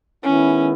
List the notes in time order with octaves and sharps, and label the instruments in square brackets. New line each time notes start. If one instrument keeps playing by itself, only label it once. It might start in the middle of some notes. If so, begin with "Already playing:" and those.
[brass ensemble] D#3 G#3 B3 E4 [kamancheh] C#4